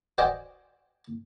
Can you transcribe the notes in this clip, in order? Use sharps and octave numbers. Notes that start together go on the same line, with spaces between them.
F#4 C5 D5 D#5 G5 G#5